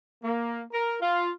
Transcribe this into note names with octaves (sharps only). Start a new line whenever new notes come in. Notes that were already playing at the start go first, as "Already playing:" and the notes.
A#3
A#4
F4